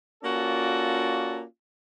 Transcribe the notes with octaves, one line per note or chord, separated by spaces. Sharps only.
A#3 C#4 F4 F#4 A4 D5